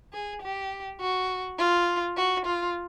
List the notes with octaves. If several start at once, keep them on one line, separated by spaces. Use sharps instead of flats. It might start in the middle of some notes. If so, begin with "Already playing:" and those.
G#4
G4
F#4
F4
F#4
F4